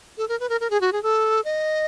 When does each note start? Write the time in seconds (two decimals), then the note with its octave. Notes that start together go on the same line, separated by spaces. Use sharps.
0.18 A4
0.29 A#4
0.40 B4
0.49 A#4
0.60 A#4
0.70 G#4
0.81 F#4
0.93 G#4
1.03 A4
1.45 D#5